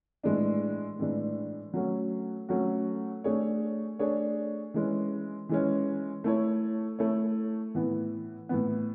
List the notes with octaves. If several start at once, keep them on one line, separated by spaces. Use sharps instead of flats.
A2 E3 G#3 D4
A2 E3 G#3 D4
F#3 A3 C#4 F#4
F#3 A3 C#4 F#4
A3 D4 G#4 C#5
A3 D4 G#4 C#5
E3 G#3 C#4
E3 G#3 C#4
A3 E4 A4 C#5
A3 E4 A4 C#5
A2 E3 B3
A2 E3 B3